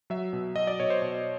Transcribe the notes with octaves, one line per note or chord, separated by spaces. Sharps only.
F#3 E5
B2
F#3 D#5
D5
B2 C#5
C5
B2